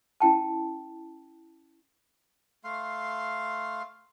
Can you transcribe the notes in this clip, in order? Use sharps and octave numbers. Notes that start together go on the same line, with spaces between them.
C#4 E4 G5 A5
A3 F5 C6